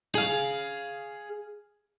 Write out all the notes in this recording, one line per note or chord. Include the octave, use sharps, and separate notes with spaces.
G#4 F5